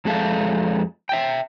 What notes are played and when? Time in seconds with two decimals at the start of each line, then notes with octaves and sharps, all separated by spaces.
0.05 F2 G#3 A4 E5 F5
1.09 E5 G5